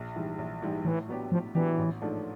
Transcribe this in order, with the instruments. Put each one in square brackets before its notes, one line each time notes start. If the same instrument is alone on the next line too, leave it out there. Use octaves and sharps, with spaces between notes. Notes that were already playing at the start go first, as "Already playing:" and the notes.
Already playing: [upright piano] A#1
G#2 E3 G3
A#1
G#2 E3 G3
[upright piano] A2 [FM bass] E3
[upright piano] F#3 B3 D4 G4
[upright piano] A2 [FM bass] F3
[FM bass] E3 [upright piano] F#3 B3 D4 G4
[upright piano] A1
G#2 F3 A3 D4